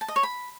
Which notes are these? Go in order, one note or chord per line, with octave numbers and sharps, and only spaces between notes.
A5
D#5
C#5
B5